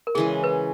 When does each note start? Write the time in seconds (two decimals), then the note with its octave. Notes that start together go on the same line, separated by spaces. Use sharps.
0.07 A#4
0.15 C#3 E3 G#3 G#4
0.44 B4